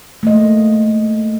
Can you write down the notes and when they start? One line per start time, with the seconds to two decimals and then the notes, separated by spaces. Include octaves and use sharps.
0.23 A3 A#3 D#5